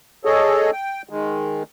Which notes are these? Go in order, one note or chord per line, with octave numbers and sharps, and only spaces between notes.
G#4 A4 C#5 D#5
G5
D#3 G#3